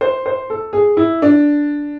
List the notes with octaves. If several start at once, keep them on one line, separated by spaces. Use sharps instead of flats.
C5
C5
A4
G#4
E4
D4